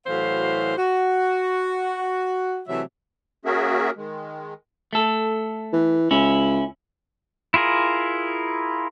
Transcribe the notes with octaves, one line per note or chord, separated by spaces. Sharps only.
A2 E3 F#3 F#4 C5 F5
F#4
C3 E3 F#3 A3 E4 E5
A#3 C#4 F#4 G#4 A#4 E5
D#3 G#3
A3 A4
E3
C#2 C#4 E4
E4 F4 G#4 A#4